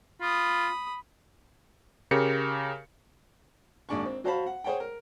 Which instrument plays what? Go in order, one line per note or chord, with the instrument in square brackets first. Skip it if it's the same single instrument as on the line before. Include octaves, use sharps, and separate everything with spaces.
[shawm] F4 [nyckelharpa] B5 D#6
[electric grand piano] C#3 G4 A#4 C#7
[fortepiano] G#1 D#2 G#3 D4 G#5 C#6
C4
F#3 F#4 C5 F5 A5 B5
F#5
G#4 C5 C#5 F#5 G5
A#4